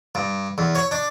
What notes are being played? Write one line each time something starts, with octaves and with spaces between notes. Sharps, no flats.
G2
E2
C#5
D4